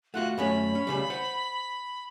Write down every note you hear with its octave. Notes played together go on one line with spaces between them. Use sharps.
A3 F4 F#4 F#5
F#2 A3 C#4 B5
C#4
C#2 C#3 G3
C5 F#5